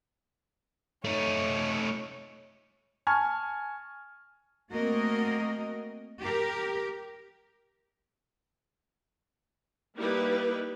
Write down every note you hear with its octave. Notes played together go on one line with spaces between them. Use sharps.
A3 D#4 C#5
G#5 A5 C#6 F6 G#6
A3 A#3 C4 F#4 A#4 D#5
G4 A#4
G3 A#3 D#4 E4 G4 B4